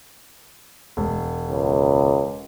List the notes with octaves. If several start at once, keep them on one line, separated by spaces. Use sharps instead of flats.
E1
C#2